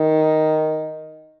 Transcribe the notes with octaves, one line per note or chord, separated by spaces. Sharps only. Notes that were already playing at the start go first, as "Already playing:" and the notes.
Already playing: D#3